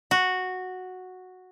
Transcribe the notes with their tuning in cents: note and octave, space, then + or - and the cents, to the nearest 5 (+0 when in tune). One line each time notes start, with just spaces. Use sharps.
F#4 -5